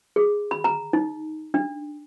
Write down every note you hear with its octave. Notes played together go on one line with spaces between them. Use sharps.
G#4
B5
A#5
D#4
D4